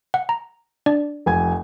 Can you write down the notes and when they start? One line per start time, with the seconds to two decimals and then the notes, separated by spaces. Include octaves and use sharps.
0.14 F#5
0.29 A#5
0.86 D4 D5
1.26 F1 G#5 G#6